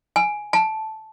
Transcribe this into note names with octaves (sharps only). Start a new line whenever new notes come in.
G#5
A5